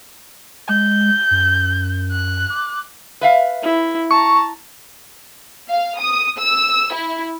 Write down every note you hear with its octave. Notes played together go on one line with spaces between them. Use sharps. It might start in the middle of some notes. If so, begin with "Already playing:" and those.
G#3 G6
F#2
F#6
D6
B4 E5 F5
E4
A5 A#5 C#6
F5
D#6
E6
E4